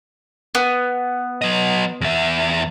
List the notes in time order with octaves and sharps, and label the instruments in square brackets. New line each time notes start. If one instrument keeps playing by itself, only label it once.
[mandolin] B3
[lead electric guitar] F#3 D#5
E2 E5